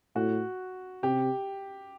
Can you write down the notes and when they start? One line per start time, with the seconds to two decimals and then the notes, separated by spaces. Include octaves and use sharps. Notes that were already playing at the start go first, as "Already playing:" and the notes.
0.15 A2 F#4
1.03 C3 G4